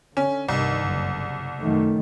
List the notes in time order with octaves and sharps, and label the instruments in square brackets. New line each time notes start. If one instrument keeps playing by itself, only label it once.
[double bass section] D3 [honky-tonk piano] C#4
[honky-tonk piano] C2 [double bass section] G2 D#3
[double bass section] F#1
F#2 D#3 A3